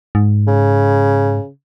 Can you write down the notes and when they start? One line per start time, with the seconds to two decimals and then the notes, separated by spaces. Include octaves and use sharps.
0.15 G#2
0.48 C#3